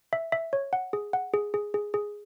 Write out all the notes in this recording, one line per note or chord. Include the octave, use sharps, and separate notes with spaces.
E5
E5
C#5
F#5
G#4
F#5
G#4
G#4
G#4
G#4